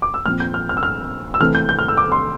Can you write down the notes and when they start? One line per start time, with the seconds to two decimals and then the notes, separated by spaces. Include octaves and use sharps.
0.02 D6
0.14 E6
0.26 A#2 F3 C4 F6
0.40 G6
0.54 F6
0.69 F6
0.77 E6
0.83 F6
1.34 E6
1.40 C3 E3 A3 C4 F6
1.55 G6
1.69 G6
1.79 F6
1.88 E6
1.97 D6
2.12 C6